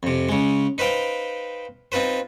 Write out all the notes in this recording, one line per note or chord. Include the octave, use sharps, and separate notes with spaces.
F2 C3
C#3 G#3
D#4 B4 C5 F5 G5
C4 D#4 F4 B4 C5